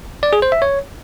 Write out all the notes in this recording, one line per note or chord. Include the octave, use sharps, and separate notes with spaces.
D5
G#4
C5
E5
C#5